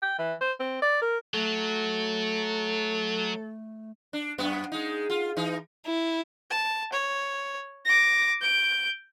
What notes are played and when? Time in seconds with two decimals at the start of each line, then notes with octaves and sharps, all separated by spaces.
0.02 G5
0.19 E3
0.41 C5
0.60 C4
0.82 D5
1.02 A#4
1.34 F#3 A3 A4
4.13 D4
4.38 F#2 B3
4.72 G#3 D#4
5.10 F4
5.37 E3 D#4
5.86 E4
6.50 A5
6.93 C#5
7.85 D6 A#6
8.41 G6 D7